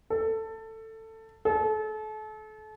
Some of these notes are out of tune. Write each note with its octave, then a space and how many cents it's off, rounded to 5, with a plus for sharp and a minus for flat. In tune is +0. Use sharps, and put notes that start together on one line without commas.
A4 +15
A4 -35